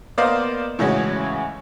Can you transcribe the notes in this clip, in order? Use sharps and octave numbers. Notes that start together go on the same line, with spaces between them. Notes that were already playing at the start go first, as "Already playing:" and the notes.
A#3 B3 C5 D5 D#5 F5
A2 C#3 E3 G#3 C#4 F#4